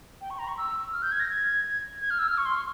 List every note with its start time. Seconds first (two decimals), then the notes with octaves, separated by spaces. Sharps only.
0.21 G5
0.30 C#6
0.39 A#5
0.48 C#6
0.58 E6
0.93 F6
1.03 G6
1.12 G#6
1.20 A#6
1.29 G#6
2.01 G#6
2.10 F6
2.19 E6
2.28 F6
2.37 C#6
2.45 C6
2.55 C#6